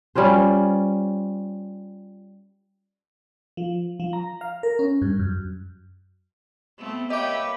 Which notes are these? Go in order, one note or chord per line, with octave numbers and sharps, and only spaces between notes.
G3 C#4 F4 C5
F3
F3
A#5
F5
A#4
C#4
G2
F#2
A3 B3 C4
A#3 G4 B4 C#5 D#5 E5 D6